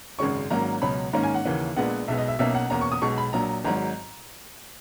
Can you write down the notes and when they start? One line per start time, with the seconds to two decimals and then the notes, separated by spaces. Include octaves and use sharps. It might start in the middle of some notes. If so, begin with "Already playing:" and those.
0.19 G#1 F#2 C#3 G#3 C#4 C#6
0.50 G#1 G#2 F#3 A#3 C#4 A#5
0.81 C#2 B2 F#3 C#4 B5
1.13 G#2 D#3 A#3 C#4 A#5
1.23 G#5
1.34 F#5
1.45 D#2 C#3 E3 A#3 C#4
1.76 A#1 A#2 G#3 B3 F#5
2.08 B1 B2 G#3 B3 E5
2.18 D#5
2.28 E5
2.39 B1 B2 A#3 C#4 E5
2.55 F#5
2.70 E2 B2 A#3 C#4 A#5
2.81 C#6
2.92 D#6
3.02 B1 B2 G#3 C#6
3.18 B5
3.33 A#1 A#2 F#3 A#5
3.65 G#1 G#2 F#3 A#5